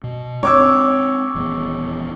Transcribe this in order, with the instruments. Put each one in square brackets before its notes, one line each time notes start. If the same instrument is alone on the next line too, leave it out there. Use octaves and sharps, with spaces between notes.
[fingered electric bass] B2
[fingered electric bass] G#3 C4 D4 [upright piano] C#5 D6 E6
[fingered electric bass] D#1 E2 B3